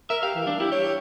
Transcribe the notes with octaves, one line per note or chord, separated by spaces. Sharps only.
A#4 E5
G4 F5
E3
G3 D4
E4 G4
G4 C#5